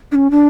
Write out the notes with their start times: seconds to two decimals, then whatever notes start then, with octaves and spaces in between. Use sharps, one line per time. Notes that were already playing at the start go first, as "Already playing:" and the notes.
0.12 D4
0.15 C#4
0.31 D4